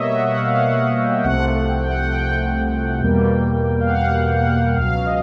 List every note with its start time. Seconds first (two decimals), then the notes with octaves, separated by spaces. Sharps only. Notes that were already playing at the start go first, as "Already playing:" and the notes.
Already playing: B2 G3 A#3 C#5 D#5 E5
0.14 F#5
0.36 F5
0.57 F#5
1.02 G5
1.24 C2 C3 F3 A3 F#5
1.46 F#5
1.68 G5
1.90 F#5
2.12 G5
3.00 E2 B2 G3 A#3
3.80 F5
3.88 F#5
4.32 F#5
4.76 C#2 B2 F#3 F5
5.06 D#5